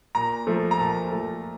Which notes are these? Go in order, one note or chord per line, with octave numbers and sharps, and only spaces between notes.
A#2 A#5
F3 A3
A#5
A#2 A5
F3 A3